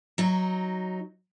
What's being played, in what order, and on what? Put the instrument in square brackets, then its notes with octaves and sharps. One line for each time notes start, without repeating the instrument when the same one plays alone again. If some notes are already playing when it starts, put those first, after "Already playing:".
[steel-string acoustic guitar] F#3 D#4